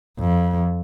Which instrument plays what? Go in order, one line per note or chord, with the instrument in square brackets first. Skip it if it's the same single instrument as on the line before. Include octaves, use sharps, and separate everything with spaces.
[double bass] F2